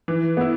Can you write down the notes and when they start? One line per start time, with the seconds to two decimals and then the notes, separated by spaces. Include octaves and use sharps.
0.08 E3
0.37 B3 E4